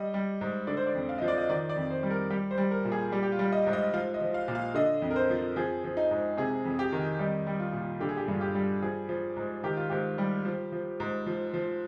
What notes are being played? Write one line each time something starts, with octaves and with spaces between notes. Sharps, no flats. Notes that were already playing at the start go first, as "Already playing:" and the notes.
Already playing: G3 D#5
G3
G#2
D3 D5
C5
D5
F2
F5
F3 D#5
D5
D#5
D#3 D5
D5
F2
C5
G3
A#4
G3 G4
C5
G3
A#4
A#2
G#4
G3 G4
G4
F4
G3
D#5
G#2
D#5
F3 F5
D#5
F3
F5
A#2
F5
D3 D#5
F2
A#4
C5
F3
F3 G#4
F3
D#4
G#2
C3 G#4
F2
G4
D#3
G3 D#4
G3
F4
A#2
D3 G4
G#4
G4
G2
F4
G4
G3
F3 G#4
F3
G#2
D#3 G4
F4
G#2 G4
G3
F3
F3
G#2
F3
F3